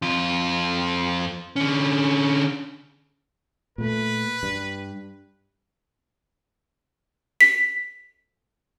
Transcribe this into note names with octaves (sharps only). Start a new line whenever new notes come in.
F2 F4
D3 C#4
A#2 A3 B4
G2
B6